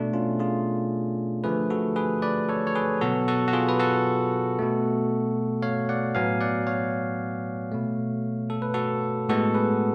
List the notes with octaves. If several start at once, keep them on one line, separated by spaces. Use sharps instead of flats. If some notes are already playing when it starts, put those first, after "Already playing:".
Already playing: B2 A3 D4
C#4 F4
F4 G#4
D3 F3 A3 G#4 B4
F#4 A4
G#4 B4
B4 D5
A4 C#5
C#5
G#4 B4
B2 F#3 B3 F#4 A4
F#4 A4
F#4
F4 G#4
B4
F#4 A4
B2 A3
C#5 F5
D5 F#5
A2 F#3 B3 F5 G#5
D5 F#5
C#5 F5
B2 A3
A4
B4
F#4 A4
A2 G#3 B3 F#4 A4
G#4 B4